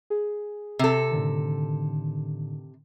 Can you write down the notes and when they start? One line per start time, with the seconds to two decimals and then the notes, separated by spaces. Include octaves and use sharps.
0.10 G#4
0.79 C3 A4
1.11 A2 D3 D#3